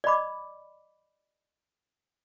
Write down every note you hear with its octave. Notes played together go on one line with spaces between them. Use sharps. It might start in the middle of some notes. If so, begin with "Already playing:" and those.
D5 D#5 B5 D6